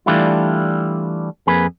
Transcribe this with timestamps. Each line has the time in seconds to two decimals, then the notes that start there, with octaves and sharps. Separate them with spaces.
0.06 E3 G3 A3 D4 E4 F4
1.47 F2 A#3 G#4 B4